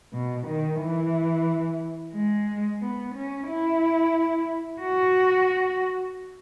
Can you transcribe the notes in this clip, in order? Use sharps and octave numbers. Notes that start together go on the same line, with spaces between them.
B2
D#3
E3
G#3
B3
C#4
E4
F#4